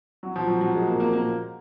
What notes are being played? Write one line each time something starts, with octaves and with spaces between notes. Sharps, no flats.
F#3
F3
F#3
F#3
G#3
A#3
A#3
A#3